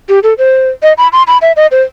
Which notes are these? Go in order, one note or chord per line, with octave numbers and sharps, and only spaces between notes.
G4
A4
C5
D#5
B5
C6
B5
E5
D#5
C5